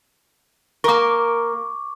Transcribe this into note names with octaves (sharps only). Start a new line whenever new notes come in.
A#3 A#4 C#6 D6